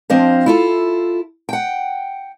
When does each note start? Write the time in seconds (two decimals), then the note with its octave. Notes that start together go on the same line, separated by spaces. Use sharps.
0.10 F3 C4 D4 C5 D#5 F5
0.46 E4 F4 A4
1.49 F#5 G5